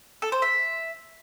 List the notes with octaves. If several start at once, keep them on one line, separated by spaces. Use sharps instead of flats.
A4
C5
E5